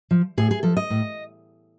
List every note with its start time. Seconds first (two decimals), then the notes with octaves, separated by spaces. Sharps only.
0.11 F3
0.38 A2 G#4
0.51 G#4
0.63 F3 A4
0.77 D#5
0.90 A2